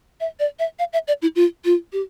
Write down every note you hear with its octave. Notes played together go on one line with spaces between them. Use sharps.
E5
D5
E5
F5
E5
D5
E4
F4
F4
G4